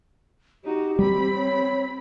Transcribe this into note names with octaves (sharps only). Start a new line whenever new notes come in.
D#4 F#4 G4
G3 C4 B5
C#5